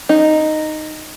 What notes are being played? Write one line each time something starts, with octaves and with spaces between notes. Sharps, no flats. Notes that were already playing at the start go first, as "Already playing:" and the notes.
D#4